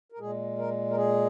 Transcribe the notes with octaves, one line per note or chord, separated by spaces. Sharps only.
A#4
A#2 G#3 G#4
A#4
A#4
G#4